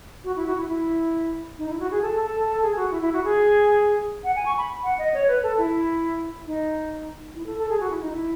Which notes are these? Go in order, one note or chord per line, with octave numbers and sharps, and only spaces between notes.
F#4
E4
F#4
E4
E4
D#4
E4
F#4
G#4
A4
A4
A4
G#4
F#4
E4
E4
F#4
G#4
F#5
G#5
C#6
B5
F#5
D#5
C#5
B4
A4
E4
D#4
E4
A4
A4
G#4
F#4
E4
D#4
E4